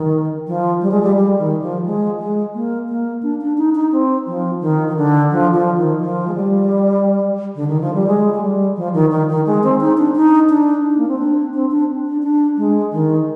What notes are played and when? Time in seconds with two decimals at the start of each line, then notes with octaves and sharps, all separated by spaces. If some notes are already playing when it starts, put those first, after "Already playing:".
Already playing: D#3
0.47 F3
0.82 G3
0.91 G#3
1.03 G3
1.16 G3
1.39 D#3
1.62 F3
1.86 G#3
2.19 G#3
2.55 A#3
2.89 A#3
3.23 D4
3.41 D4
3.58 D#4
3.75 D#4
3.92 C4
4.27 F3
4.61 D#3
4.88 D#3
4.96 D3
5.31 F3
5.54 F3
5.78 D#3
6.01 F3
6.28 G#3
6.35 G3
7.55 D3
7.68 D#3
7.81 F3
7.94 G3
8.07 G#3
8.34 G#3
8.42 G3
8.76 F3
8.94 D#3
9.11 D#3
9.29 D#3
9.47 G#3
9.63 C4
9.81 D#4
9.98 D4
10.15 D#4
10.49 D4
10.84 D#4
10.98 A#3
11.08 C4
11.19 D4
11.54 C4
11.71 D4
12.06 D4
12.23 D4
12.57 G#3
12.92 D#3